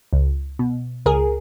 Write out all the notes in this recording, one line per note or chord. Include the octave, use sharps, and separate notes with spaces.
C#2
B2
C#2 G#4 A#4